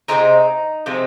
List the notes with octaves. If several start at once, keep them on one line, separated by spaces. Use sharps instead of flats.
C3 F3 G#3 C4 D#4
C3 F3 G#3 C4